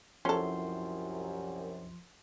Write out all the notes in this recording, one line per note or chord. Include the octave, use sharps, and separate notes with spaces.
C2 F#2 F3 C#4 A4 C6